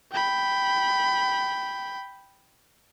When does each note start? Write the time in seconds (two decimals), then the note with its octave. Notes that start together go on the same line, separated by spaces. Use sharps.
0.12 G5 B5